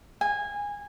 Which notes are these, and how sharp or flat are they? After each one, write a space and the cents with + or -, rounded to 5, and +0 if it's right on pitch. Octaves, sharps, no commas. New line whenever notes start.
G#5 -20